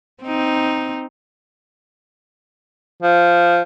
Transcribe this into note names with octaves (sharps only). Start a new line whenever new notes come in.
C4 D#4
F3